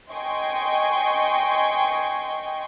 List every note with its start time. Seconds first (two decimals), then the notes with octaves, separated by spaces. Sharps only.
0.13 D#5 G5 G#5 C6 C#6